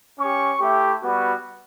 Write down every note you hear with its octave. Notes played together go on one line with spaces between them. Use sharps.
C#4 G4 C#6
A3 E4 G4
G3 B3 F#4